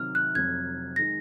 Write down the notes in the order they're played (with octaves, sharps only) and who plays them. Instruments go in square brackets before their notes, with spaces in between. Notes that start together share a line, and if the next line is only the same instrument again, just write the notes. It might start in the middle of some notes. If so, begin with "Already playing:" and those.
Already playing: [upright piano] C3 D#3 F#3 [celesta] F6
[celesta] F#6
[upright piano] F1 F2 C3 F#3 [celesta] G#6
[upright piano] D#3 G#3 D#4 [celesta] A#6